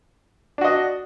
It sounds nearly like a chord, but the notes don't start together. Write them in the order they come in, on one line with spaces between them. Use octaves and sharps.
D4 F#4 D#5